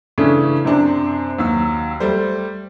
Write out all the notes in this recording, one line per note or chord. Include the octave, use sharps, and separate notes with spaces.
C#3 E3 A3 C#4 D4
F#2 C3 C4 D4
D#2 F#3 E6
G3 A3 C5